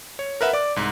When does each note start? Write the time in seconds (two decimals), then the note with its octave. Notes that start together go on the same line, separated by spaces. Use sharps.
0.19 C#5
0.41 A#4 B4 E5 F#5
0.53 D5 D6
0.76 C2 G#2